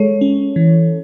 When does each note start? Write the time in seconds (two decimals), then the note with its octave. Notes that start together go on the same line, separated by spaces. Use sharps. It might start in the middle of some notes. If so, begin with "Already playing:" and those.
Already playing: G#3 A4 C#5
0.21 C#4
0.56 E3